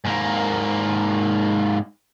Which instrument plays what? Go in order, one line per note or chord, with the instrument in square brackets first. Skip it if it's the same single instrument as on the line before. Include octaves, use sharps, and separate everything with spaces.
[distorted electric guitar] G#2 A#3